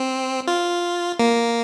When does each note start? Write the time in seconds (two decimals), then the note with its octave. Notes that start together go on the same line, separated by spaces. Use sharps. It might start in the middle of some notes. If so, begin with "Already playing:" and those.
Already playing: C4
0.48 F4
1.19 A#3